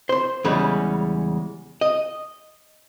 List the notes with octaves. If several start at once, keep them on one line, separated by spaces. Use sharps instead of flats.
C5 C6
E2 C#3 G3 G#3 C#4
D#5